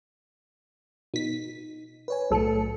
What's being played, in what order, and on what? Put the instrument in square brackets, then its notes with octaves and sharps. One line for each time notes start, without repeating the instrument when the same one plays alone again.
[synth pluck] B2 B6 [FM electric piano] D#4
[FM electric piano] B4 C#5 G#5
[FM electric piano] B1 A3 C#7 [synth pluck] A2 F#3 A4